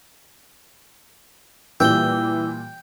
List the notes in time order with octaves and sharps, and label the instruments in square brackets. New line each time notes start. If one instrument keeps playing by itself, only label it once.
[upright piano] A#2 G3 [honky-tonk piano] E3 [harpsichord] G5 [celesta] E6 G7